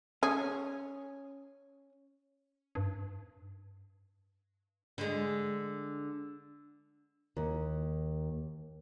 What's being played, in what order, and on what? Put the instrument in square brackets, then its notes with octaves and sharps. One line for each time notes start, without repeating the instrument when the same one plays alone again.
[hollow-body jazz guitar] C#4 [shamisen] G#4
[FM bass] G2
[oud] D3 G#3
[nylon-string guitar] D#2